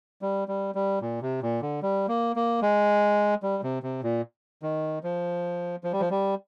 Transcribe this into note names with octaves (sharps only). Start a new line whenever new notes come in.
G3
G3
G3
A#2
C3
A#2
D3
G3
A#3
A#3
G#3
G3
C3
C3
A#2
D#3
F3
F3
G3
F3
G3